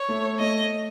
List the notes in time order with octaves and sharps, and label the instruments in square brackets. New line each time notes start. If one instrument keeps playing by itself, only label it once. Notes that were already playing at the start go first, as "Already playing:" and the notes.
Already playing: [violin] C#5
[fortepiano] A3
[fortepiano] A3 [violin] D#5